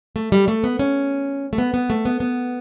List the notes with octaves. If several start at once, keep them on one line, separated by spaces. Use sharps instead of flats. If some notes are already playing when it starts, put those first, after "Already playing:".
A3
G3
A3
B3
C#4
A3
B3
B3
A3
B3
B3